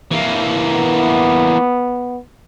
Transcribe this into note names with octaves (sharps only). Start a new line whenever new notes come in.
E3 A#3
B3